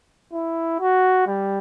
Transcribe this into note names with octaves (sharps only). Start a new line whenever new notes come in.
E4
F#4
G3